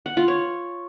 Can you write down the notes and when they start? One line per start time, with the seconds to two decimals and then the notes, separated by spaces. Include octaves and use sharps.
0.06 F#5
0.17 F4
0.28 C#5